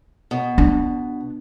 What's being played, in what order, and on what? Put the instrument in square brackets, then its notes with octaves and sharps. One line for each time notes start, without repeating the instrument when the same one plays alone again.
[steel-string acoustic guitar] B2
[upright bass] D4